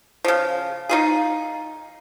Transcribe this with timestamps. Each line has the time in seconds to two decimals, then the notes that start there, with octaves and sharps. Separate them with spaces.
0.24 C#3 F3
0.89 D#4 F4 G#4